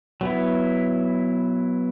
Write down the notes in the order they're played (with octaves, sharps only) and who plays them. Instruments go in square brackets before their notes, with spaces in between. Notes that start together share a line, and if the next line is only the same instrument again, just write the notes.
[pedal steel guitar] F#3 B3 E4